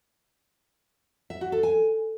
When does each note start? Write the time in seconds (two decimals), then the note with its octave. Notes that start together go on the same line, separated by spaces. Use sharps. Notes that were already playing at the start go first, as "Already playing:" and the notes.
1.30 E5
1.41 F#4
1.52 A4
1.63 G#5